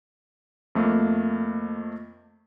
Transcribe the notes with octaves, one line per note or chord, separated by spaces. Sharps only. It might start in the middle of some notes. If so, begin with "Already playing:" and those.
F2 A3 A#3